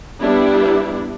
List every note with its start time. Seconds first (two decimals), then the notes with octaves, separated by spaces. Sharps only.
0.20 G3 B3 D4 E4